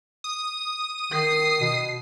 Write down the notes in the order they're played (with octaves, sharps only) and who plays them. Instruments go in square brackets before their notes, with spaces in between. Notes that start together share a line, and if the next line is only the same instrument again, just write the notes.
[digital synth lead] D#6
[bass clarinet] D#3 [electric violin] C7
[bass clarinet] B2